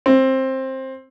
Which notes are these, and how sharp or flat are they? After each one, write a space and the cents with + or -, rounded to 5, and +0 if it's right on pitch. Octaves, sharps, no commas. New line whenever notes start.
C4 +15